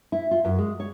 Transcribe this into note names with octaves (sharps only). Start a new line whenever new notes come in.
E4
F4
F#2
G#3
C#5